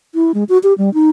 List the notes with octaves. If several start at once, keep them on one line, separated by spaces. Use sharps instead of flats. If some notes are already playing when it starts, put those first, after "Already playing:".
E4
G#3
F#4
G4
G3
D#4